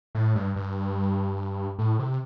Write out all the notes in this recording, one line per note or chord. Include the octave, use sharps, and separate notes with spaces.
A2
G2
G2
A2
C3